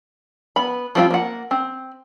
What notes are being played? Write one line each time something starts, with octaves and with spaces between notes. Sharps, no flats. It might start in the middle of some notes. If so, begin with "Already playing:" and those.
B3 B5
F3 G3 C4 E4 F4
A#3 F#5
C4